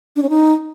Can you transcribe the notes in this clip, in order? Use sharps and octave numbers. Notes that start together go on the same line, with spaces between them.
D4
C#4
D#4